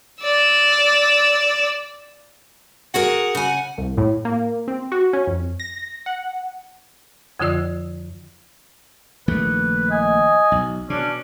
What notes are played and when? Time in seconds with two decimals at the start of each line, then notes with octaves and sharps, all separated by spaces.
0.21 D5 E6
2.94 F#4 G#4 A#4 F#5
3.35 C#3 G#5
3.78 C2
3.97 A2
4.25 A#3
4.68 C4
4.92 F#4
5.13 C#4
5.27 F2
5.60 A#6
6.06 F#5
7.40 F2 D3 F3 F4 D5 E6
9.28 A#1 D#3 A3 B4
9.91 D#5 G#5
10.52 B1
10.90 B2 C#4 D4